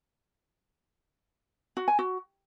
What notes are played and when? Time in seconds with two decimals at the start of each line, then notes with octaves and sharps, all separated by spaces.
1.77 F#4
1.88 G#5
1.99 F#4